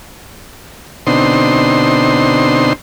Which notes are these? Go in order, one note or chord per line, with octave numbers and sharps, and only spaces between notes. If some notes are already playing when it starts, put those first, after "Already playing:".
B2 D3 C4 D#4 C6